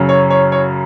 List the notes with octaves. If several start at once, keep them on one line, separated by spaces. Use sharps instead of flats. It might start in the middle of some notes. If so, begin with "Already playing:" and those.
Already playing: F#2 C#3 F#3
C#5
C#5
C#5